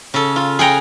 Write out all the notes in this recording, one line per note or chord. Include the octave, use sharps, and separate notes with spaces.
C#3 A4
F4
G#4 F#5 G5 A#5